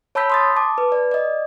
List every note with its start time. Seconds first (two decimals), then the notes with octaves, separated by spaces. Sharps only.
0.15 C#5 A5 B5 E6 G6 B6
0.30 C6 D#6 A6
0.56 A5 D6
0.78 B4
0.92 D5
1.11 D5 D#5